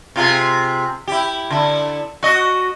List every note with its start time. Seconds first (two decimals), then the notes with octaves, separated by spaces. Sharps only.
0.16 C3 F4 G#4
1.08 E4 G4
1.50 D3 E4
2.23 F#4 D#5